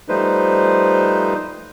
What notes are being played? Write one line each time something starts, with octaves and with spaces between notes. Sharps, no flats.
F3 G3 A3 D#4 B4 C5